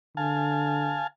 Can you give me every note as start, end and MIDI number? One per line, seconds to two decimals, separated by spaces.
0.17 1.02 50
0.17 1.07 77
0.17 1.07 80
0.17 1.07 81